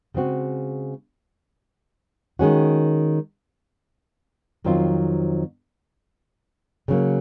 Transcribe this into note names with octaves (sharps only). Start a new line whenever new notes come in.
C#3 G#3 C4 F#4
D#3 G#3 C#4 F#4
F2 D#3 F#3 C4 F4
C#3 F#3 A#3